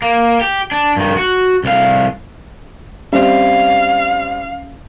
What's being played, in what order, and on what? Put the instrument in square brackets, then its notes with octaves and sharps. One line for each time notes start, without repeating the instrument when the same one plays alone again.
[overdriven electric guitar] A#3
G4
D4
G2 D#3
F#4
C2 F5
[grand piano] G3 C4 [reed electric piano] C#4 E5 [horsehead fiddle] F5